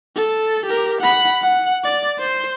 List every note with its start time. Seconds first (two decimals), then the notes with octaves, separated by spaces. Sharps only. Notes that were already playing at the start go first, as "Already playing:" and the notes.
0.16 A4
0.66 G4 A#4
1.01 F#5 B5
1.42 F#5
1.84 D5
2.19 C5